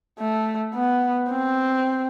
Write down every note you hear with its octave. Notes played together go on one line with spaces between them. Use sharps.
A3
B3
C4